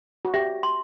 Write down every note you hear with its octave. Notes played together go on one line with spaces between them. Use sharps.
F#4
G4 E5
C6